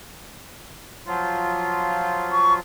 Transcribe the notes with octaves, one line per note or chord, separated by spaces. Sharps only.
F3 F#3 F4
C#6